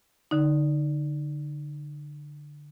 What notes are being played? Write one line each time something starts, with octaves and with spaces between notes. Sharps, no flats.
D3 D#4